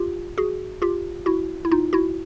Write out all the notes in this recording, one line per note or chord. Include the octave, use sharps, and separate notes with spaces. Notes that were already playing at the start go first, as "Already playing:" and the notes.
Already playing: F4 G4
F#4 G#4
F4 G4
E4 F#4
E4
D#4 F4
E4 F#4